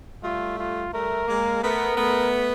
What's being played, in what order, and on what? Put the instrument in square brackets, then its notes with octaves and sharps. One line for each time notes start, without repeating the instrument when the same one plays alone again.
[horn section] G3 A3 [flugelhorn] F4
[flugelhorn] F4
[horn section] G3 A3 [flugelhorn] A#4
[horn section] G#3 A#3
[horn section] A3 B3 [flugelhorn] A#4
[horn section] A3 B3